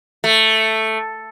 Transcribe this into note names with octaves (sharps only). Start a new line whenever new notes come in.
A3